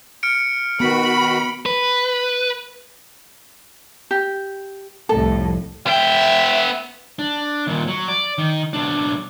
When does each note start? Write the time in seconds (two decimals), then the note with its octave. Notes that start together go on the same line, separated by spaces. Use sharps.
0.23 F6 C#7 D7
0.80 D#3 B3 F#4 B5
1.66 B4
4.11 G4
5.09 C2 F2 A2 A4
5.87 B3 E5 G5
7.19 D4
7.67 D#2 A#2
7.88 F#3
8.08 D5
8.38 D#3
8.73 B1 D4